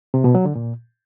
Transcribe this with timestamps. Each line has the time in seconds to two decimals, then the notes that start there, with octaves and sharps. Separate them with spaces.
0.14 C3
0.24 B2
0.35 F#3
0.45 D3
0.55 A#2